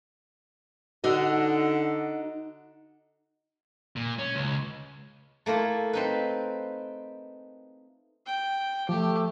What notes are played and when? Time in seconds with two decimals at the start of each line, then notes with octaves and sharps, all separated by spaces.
1.04 D3 D#4 F#4 D#5
3.96 A#2
4.19 C#4
4.36 C#2
5.46 A3 A#3 E4 F4
5.93 C4 D#4 B4
8.26 G5
8.89 F3 A3 G4